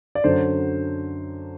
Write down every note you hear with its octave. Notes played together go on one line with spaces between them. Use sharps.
D5
F#2 D3 F#3 C5